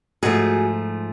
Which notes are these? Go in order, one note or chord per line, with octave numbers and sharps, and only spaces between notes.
G#2 F3 A3 F#4 G#4